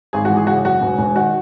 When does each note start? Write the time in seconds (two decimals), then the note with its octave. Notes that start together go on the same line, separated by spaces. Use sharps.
0.13 G#1 G#4
0.25 F#4
0.30 E3
0.37 G#4
0.47 C#3 F#4
0.65 F#2 F#4
0.82 E1
0.98 E1
1.16 D#3 F#4